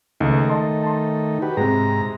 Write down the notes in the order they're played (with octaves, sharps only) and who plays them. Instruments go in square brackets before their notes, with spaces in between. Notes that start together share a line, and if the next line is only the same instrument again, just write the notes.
[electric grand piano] C#2 [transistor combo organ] D#3 A3 D#4
[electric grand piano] D#5 A5 C6
A5 C6
[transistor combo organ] F#4 G4 B4
[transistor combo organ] G#2 A#5 [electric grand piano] C3 G#3